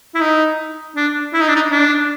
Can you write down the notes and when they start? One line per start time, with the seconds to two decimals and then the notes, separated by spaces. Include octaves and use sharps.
0.14 E4
0.21 D#4
0.96 D4
1.33 E4
1.41 D#4
1.48 D4
1.56 D#4
1.71 D4